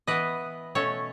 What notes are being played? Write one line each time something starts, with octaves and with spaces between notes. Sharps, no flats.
E3 B3 B4 D#5
B2 A3 C#4 A4 C#5